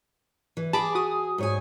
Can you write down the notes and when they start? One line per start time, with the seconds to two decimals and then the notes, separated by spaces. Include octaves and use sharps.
0.57 E3
0.73 G#4 A5 B5 D6
0.95 F#4 D#6
1.38 G#2 C#5 G#5